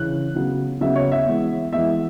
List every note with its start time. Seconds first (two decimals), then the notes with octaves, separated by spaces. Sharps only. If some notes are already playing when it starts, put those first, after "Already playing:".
Already playing: C#3 E3 C#4 F#6
0.34 C#3 F#3 B3
0.81 C#3 F#3 B3 E5
0.96 C#5
1.12 E5
1.26 E3 G#3 B3
1.73 E3 G#3 B3 E5